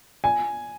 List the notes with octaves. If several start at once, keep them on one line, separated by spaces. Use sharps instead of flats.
G#5